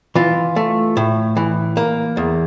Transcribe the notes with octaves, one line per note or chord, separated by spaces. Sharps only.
E3 F4
A3
A2
E3
A#3
E2